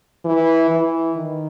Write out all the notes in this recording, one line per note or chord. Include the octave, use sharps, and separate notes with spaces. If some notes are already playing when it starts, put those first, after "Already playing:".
E3
E3
D#3